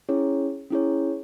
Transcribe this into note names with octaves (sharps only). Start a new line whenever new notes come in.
C#4 E4 G#4 C#5
C#4 E4 G#4 C#5